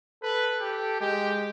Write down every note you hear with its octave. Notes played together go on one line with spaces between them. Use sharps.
A4 B4
G4
G#3 G4